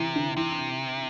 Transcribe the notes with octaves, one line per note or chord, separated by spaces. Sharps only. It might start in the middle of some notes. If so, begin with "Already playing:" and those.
Already playing: C3 E3
D3
C3 E3